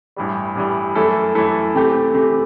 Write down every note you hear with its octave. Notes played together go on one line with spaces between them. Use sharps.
A1 G2 E3 G3
A1 G2 E3 G3
F#2 E3 A3 E4 A4
F#2 E3 A3 E4 A4
C3 E3 A3 C4 G4
C3 E3 A3 C4 G4